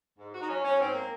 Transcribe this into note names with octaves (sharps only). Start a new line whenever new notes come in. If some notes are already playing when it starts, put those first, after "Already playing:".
G#2
F#4
D#4
F#3 C#4
C#4
G#2 C4
A#3